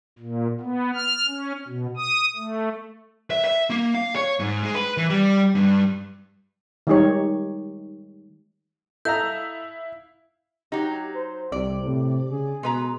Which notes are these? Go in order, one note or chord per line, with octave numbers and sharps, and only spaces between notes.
A#2
B3
F6
C#4
B2
D#6
A3
E5
E5
A#3
F5
C#5
G#2
G#3
B4
E3
G3
G2
D#3 G3 G#3 D#4 G4 C#5
E4 A4 D#5 F5 A#5 E6 G6
F#3 D#4 G4
C5
C2 C3 D5
A2 C3
C#3 G#4
B2 G#3 B4 A#5